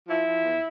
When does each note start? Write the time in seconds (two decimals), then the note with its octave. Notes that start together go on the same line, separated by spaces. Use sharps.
0.09 F3 E4
0.27 F3
0.44 E2